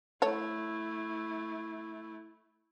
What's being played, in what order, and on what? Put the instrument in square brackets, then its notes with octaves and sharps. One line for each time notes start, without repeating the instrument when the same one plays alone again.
[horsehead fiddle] A3 E4 [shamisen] A4 C#5